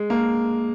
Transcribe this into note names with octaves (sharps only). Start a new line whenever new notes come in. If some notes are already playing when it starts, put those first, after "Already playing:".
Already playing: G#3
A#3